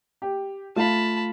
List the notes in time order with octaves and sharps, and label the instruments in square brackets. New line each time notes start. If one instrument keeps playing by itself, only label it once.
[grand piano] G4
[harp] A3 [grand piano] F4 F5 [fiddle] A5 B5